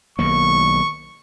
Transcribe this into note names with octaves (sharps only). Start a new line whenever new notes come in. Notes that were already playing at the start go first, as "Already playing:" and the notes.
B1 D#3 A#3 C#6